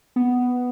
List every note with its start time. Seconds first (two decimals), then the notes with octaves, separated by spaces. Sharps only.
0.16 B3